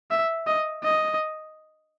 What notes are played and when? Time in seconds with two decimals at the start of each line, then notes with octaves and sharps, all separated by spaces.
0.11 E5
0.47 D#5
0.84 D#5